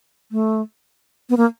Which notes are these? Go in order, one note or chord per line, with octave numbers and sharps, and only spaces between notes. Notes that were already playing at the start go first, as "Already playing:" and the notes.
A3
B3
A#3